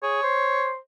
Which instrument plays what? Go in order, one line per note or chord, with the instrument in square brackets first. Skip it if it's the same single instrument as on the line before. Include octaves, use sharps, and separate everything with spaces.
[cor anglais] G#4 [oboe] C#5
[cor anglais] C5